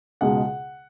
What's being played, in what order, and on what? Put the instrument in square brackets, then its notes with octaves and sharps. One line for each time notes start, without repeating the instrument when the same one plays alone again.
[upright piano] C#2 B2 G#3 F#5